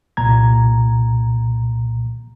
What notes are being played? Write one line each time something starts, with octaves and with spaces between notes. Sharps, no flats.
C2 A#2 A#5 G#6